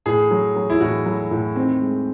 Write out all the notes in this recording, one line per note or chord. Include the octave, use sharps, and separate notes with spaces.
A2 G#4
F#3
F#3
E4
A2 F#4
F#3
A2
D#3 C4
G#3